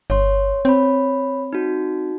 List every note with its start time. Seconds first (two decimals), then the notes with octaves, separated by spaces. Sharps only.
0.10 G1 C#5 C6
0.65 C4 C#5 B5
1.53 D#4 F#4